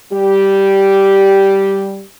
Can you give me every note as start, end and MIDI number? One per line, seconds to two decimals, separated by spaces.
0.12 2.04 55
0.12 2.04 67